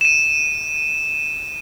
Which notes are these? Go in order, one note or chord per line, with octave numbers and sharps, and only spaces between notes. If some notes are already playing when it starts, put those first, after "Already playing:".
D#7 E7